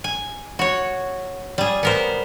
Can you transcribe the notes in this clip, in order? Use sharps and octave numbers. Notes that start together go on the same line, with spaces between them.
G#5
F#4 C#5
G3 G#4
B3 A#4 C5